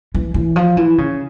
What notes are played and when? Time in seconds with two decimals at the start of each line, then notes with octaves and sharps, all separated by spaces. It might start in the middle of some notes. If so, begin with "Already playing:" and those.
0.15 E3
0.34 E3
0.56 F3
0.77 E3
0.98 C#3